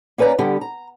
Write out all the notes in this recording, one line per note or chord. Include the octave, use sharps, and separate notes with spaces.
A#3 C#4 B4 D5 A#5
D3 G3 B3 G4
A#5